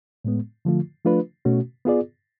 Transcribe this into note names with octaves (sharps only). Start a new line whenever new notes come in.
A2 G#3 B3
D3 F3 A3 F4
F3 A3 D4 F4 B4
B2 A3 C#4 F#4
B3 F4 G#4 D5